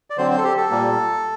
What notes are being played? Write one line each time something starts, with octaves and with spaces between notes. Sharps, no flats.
D5
D3 F#3 C4 C5
C5
A4
G4
A4
A#2 G3 A#3